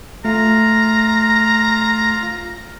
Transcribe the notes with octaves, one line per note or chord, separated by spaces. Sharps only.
A3 F4 A#5